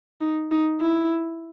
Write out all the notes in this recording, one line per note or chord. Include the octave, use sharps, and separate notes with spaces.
D#4
D#4
E4